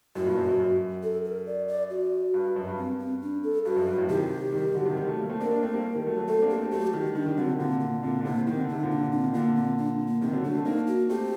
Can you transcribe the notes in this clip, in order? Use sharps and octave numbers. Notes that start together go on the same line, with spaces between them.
F#2 A2 F#4
G2 A#2
F#2
F#2
F#2
A4
A#4
D5
D5
F#4
G2
G2
F#2
G2
G2 C4
C4
D4
A4
G2 F#4
F#2
G2
F#2 A2
C3 D#3 G4
D#3 G3
D#3 G3
D3 F#3
C3 D#3
D#3 G3
F#3 A3
G3 A#3
A3 C4
A#3 D4 A#4
A#3 D4
A3 C4
G3 A#3
D#3 G3
F#3 A3
F#3 A3
A3 C4 A4
A#3 D4
G4
A3 C4
F#3 A3 G4
F#4
D#3 G3 D#4
D#3 G3 D4
D#3 G3
D3 F#3 C4
C3 D#3
A#2 D3 C4
A#3
A#2 D3 C4
D3
A2 C3 A#3
D#3 C4
D3
C3 D#4
A#2 D3
D4
C4
D#3
A#2 D3 A#3
C4
D4
A#3
C3 D#3 C4
D3 F#3
F#3 A3 D4
A3 C4
A#3 D4 D#4
F#4
A3 C4 G4